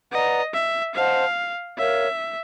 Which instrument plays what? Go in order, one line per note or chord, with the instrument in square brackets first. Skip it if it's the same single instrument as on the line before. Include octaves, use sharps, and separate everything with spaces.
[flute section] B4 D5 F#5 A#5 [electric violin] D#5
[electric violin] E5
[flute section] C5 D#5 F#5 A5 [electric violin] F5
[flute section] A#4 C#5 F5 [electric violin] E5